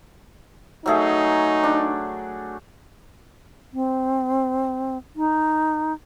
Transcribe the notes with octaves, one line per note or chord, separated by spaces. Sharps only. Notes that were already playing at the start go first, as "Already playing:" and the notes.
F#3 A3 D#4 G#4
D4
C4
D#4